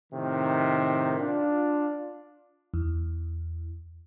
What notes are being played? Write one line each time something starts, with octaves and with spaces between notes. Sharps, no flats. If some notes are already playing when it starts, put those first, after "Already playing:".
A2 C3 D#3
D4 F4
E2